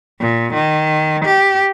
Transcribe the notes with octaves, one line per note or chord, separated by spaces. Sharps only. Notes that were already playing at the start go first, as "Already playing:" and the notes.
A#2
D#3
G4